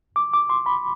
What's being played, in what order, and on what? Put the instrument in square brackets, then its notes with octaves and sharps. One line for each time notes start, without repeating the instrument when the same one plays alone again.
[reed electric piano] D6
D6
C6
B5